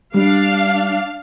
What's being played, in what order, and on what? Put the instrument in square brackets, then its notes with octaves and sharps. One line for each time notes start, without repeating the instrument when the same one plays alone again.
[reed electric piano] G3 [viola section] D4 F5